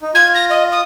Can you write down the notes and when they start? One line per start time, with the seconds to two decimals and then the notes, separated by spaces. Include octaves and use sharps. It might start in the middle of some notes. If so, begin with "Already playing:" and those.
0.01 D#4
0.14 F4 G#6
0.34 A#6
0.49 D#5
0.71 D#6